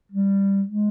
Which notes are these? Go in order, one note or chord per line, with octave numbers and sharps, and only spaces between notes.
G3
G#3